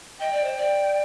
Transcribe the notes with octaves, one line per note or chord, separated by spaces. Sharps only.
D#5 G5
D5
C5
D5